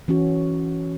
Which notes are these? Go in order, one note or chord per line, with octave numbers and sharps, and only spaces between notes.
E3 C#4 F#4